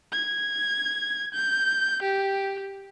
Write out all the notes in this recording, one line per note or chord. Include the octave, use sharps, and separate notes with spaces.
G#6
G6
G4